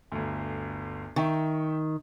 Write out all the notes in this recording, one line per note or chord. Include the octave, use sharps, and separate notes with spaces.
G1 D2
D#3 E5 G5 C#6